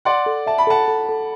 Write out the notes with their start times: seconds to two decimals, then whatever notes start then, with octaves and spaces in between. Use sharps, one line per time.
0.05 D5 F#5 C6
0.26 A4
0.47 E5 A5
0.58 B5
0.67 A4 F#5 A5
0.88 A4
1.09 A4